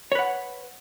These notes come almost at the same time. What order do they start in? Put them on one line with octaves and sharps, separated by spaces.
C#5 B4 F#5